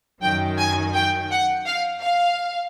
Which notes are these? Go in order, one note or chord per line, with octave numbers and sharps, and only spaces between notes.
F#2 D#3 F#3 G5
G#5
G5
F#5
F5
F5